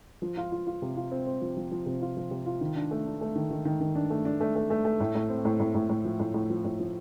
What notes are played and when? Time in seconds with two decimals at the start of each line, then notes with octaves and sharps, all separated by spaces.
0.22 F3
0.37 F4
0.52 F4
0.67 F4
0.82 C3
0.97 F4
1.12 C4
1.26 C4
1.41 F3
1.57 F3
1.71 F3
1.86 C3
2.02 F4
2.17 F3
2.31 C3
2.46 F4
2.61 D#3
2.75 D4
2.91 A3
3.06 D4
3.21 A3
3.35 D#3
3.51 D#3
3.65 D#3
3.81 D#3
3.95 D4
4.10 A3
4.25 D4
4.40 A3
4.55 A3
4.70 A3
4.85 A3
5.00 A2
5.15 A2
5.29 C4
5.45 A2
5.60 A2
5.75 A2
5.89 A2
6.05 F3
6.19 A2
6.34 A2
6.50 F3
6.64 A2
6.79 F3